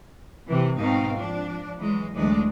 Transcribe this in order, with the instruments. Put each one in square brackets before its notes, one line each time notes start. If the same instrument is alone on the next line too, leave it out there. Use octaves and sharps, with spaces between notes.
[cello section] C3 E3
G#2 B2 C4 D#4 F5
F3 D4
E3 F#3 G#3
D2 E3 F#3 G#3 D4